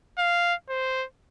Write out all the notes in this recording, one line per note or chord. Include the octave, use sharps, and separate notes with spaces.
F5
C5